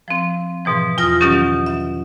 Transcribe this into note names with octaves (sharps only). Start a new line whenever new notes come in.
F3 C4
G#2 B2 E3 F3
E2 F4 D#6 F6 A#6
B2 D#3 F#3 C#4 G4
E5